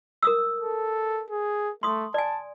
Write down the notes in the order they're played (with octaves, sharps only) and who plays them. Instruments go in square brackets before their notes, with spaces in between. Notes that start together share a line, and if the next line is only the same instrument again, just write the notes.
[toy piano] A#4 D#6 E6
[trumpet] A4
G#4
[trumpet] A3 [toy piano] C6 D#6
[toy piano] D5 G#5 [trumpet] A5